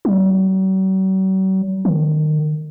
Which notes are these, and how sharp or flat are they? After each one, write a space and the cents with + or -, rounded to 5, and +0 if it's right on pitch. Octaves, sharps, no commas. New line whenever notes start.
F#3 +45
D#3 -25